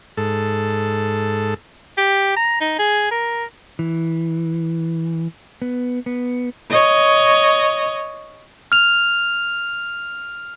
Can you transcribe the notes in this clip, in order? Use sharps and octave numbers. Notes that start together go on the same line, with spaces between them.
G#2 A4
G4
A#5
D#4
G#4
A#4
E3
B3
B3
C#5 D#5
F6 F7